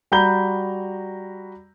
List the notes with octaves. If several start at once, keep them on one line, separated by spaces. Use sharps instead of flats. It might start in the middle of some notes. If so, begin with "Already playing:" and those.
G3 F#4 A#5 B5 G6 G7